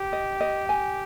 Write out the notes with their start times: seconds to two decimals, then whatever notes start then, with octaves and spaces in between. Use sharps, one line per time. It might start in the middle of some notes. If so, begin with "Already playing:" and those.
Already playing: G4
0.13 D#5
0.40 D#5
0.69 G#5